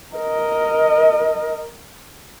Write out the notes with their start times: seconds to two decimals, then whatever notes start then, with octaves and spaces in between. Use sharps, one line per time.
0.15 A#4 D#5